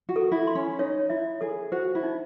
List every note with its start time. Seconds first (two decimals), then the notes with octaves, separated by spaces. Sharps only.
0.09 F#4
0.16 A4
0.32 E4
0.47 C6
0.55 C#4
0.79 D#4 C#5
1.09 E4 E5
1.41 G#4 A4
1.72 F#4 C5
1.95 E4
2.03 D#4